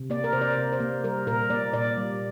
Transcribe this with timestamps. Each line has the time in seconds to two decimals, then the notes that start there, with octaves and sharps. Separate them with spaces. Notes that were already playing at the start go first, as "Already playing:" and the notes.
Already playing: C3
0.10 A#3 D5
0.24 A#4
0.33 C3 C5
0.41 D5
0.57 C3
0.73 C5
0.80 A#3
1.04 G3 A#4
1.27 A#2 A#4
1.50 A#3 D5
1.74 A#2 D5
1.97 G3